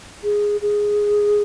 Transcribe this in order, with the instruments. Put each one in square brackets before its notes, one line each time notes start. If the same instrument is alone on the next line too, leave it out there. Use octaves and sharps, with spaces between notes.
[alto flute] G#4
G#4